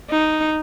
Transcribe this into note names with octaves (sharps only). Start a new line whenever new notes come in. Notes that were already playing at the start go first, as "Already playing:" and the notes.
D#4